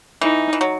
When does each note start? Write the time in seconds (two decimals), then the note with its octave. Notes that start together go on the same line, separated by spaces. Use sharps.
0.21 E3 D#4
0.53 E3
0.61 F#3